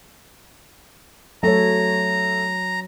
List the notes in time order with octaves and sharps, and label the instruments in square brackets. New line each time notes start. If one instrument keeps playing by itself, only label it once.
[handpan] F#3 C#5 [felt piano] A3 A4 [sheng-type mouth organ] A#5